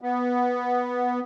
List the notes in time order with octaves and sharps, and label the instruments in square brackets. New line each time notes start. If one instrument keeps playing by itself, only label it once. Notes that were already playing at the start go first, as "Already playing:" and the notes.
[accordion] B3